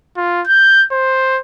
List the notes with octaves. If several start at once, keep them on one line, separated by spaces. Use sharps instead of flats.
F4
G6
C5